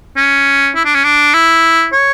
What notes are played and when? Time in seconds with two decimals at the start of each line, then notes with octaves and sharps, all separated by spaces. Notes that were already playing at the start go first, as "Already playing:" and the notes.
0.17 C#4
0.75 E4
0.85 D4
0.94 C#4
1.04 D4
1.34 E4
1.93 C#5